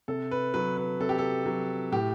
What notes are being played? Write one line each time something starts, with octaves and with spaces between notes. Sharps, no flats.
C3 A4
B4
F#3 B4
B4
C3 A4
G4
A4
F#3
A2 G4